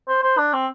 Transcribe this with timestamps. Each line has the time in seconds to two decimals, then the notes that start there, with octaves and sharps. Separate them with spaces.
0.08 C5
0.23 C5
0.38 D4
0.53 C4